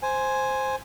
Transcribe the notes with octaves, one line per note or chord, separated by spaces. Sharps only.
C5 G#5